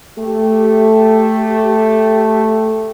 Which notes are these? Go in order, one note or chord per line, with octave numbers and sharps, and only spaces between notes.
A3 G4